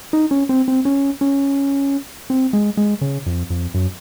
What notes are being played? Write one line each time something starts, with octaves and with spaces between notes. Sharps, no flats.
D#4
C#4
C4
C4
C#4
C#4
C4
G#3
G#3
C#3
F2
F2
F#2